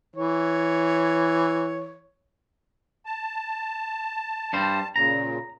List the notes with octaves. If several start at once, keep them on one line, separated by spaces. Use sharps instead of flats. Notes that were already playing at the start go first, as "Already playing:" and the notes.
E3 C#5
A5
G2 G3 C5
A#2 C#3 A#5